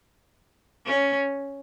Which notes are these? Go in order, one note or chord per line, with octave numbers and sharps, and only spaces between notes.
C#4